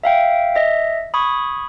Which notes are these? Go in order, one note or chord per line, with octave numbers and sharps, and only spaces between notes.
E5 F5 G5
D#5 E5
B5 C#6 D#6 G#6